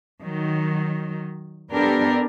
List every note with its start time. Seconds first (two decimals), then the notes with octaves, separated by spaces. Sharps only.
0.21 D#3 F#3
1.73 B3 D4 G4 A4 A#4